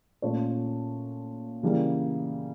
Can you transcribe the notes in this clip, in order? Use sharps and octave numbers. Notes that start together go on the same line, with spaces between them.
A#2 A3 C#4 F4 C#5
C#3 E3 G3 A#3